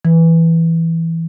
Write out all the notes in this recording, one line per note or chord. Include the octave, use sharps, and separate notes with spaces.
E3